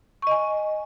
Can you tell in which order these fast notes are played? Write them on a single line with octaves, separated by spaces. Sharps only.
C#6 D#5 G#5